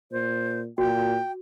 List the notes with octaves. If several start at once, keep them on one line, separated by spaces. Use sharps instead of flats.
A#2 C5
A#2 F#4 G5